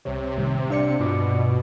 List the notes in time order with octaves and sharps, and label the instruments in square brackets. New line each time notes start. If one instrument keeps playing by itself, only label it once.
[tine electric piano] C2 C#5 [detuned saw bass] C3
[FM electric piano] A2 D#3 G3
[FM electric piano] D4 D5 C#7 [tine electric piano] F5
[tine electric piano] G2 F4 D6 [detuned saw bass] B2